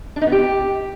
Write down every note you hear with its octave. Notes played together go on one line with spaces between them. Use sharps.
D4
D#4
B3
G4